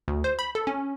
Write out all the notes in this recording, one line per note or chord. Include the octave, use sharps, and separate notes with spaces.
D2
C5
B5
A4
C#4